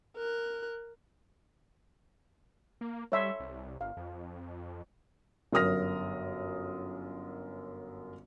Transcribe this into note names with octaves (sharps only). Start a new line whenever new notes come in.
A#4 F#6
A#3
G3 C#5 E5 C6
C2
G1 F5
F2
G1 F#2 A#4 D#6 F6 A#6